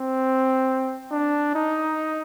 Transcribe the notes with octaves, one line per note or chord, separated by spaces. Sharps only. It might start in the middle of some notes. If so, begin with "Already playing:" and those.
Already playing: C4
D4
D#4